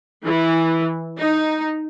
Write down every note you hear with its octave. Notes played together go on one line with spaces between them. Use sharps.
E3
D#4